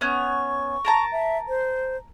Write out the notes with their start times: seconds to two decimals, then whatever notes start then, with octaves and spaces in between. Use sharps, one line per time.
0.01 B3 C#4 C#6
0.85 A#4 A5 A#5
1.12 E5
1.48 C5